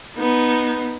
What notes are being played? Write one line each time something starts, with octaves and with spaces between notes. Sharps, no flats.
B3 D#4